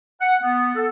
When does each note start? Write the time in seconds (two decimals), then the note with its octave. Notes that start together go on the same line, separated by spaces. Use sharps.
0.21 F#5
0.42 B3
0.76 A4